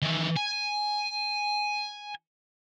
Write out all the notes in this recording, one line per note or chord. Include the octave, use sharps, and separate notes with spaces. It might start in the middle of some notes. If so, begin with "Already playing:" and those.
D#3 E3
G#5